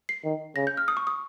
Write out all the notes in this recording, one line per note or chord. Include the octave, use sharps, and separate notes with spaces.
C7
D#3
C#3 A#6
G6
F6
D#6
C#6
D#6